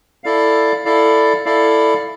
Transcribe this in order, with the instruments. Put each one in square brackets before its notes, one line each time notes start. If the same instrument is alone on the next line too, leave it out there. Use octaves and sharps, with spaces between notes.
[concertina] E4 A4 D5 F5
E4 A4 D5 F5
E4 A4 D5 F5